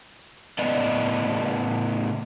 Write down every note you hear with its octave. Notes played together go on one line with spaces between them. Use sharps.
A2 C#3 B3 D5 D#5